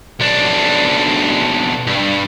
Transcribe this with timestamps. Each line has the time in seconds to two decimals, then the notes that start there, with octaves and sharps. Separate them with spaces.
0.20 B1 D4
1.87 G2